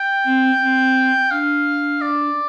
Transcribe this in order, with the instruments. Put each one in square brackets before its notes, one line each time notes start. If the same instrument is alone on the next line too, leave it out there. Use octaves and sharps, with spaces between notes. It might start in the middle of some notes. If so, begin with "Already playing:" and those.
Already playing: [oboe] G5
[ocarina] C4
C4
[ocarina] D4 [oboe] F5
[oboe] D5